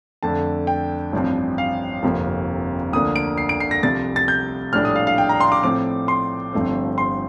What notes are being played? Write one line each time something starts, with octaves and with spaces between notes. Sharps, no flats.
F2 D3 A3 D4 A5
G5
A1 G2 F3 C4
F5
G1 F2 C3 F3 A#3
D2 D3 F3 A#3 D4 D#6
D7
C7
D7
C7
A#6
C2 C3 F3 A6
A6
G6
A#1 A2 G3 D4 F6
D#6
F5
F5
G5
A#5
C6
D6
A2 F3 C4 D6
C6
G1 G2 F3 A3 C4
C6